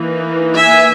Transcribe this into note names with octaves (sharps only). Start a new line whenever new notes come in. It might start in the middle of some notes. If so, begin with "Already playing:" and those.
Already playing: E3 A#3 D#4
E5 G#5